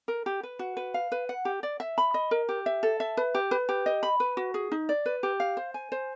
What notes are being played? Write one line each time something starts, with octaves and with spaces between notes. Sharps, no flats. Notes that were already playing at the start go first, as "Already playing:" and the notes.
A#4
G4
B4
F#4
B4
F5
B4
F#5
G4
D5
E5
B5
D#5
A#4
G4
E5
A4
E5
B4
G4
B4
G4
D#5
B5
B4
F#4
G#4
D#4
D5
B4
G4
F5
C5
G#5
C5